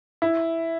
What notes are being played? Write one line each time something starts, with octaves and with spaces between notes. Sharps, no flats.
E4